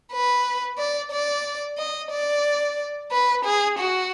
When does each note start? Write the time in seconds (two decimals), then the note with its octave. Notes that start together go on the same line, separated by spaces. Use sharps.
0.12 B4
0.78 D5
1.12 D5
1.78 D#5
2.11 D5
3.11 B4
3.44 G#4
3.79 F#4